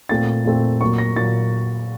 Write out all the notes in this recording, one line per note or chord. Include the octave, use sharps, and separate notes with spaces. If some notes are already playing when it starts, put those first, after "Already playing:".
A#2 A3 C4 A6
A#2 A3 C4
A#2 F#3 A#3 C#6
A#6
A#2 F#3 A#3 A6